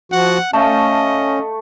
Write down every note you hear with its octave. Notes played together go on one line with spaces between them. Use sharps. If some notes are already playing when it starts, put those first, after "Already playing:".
F3 F#4 F#5
A3 C#4 D#5 F5 A5